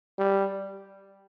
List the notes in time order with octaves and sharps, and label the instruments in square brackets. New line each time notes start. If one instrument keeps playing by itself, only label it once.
[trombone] G3